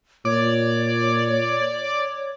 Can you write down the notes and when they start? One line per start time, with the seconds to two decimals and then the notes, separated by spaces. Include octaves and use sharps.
0.25 A#2 C#5 D5